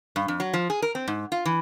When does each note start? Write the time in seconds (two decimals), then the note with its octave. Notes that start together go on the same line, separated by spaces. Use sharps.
0.16 G2
0.28 F2
0.40 F#3
0.54 F3
0.70 G#4
0.82 A#4
0.95 C4
1.08 G#2
1.32 F4
1.45 E3